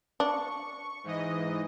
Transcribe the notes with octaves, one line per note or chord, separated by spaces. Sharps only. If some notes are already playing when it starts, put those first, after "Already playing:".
D4 C#6
G#2 E3 D#5